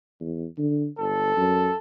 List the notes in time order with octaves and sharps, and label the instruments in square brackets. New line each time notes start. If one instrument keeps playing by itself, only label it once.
[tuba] E2
D3
[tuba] G1 [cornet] A4
[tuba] F#2